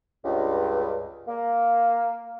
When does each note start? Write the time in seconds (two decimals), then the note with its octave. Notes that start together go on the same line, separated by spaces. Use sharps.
0.25 C#2 G2
1.28 A#3